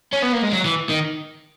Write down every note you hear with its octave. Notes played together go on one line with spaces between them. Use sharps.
C#4
B3
A#3
G#3
F#3
E3
D#3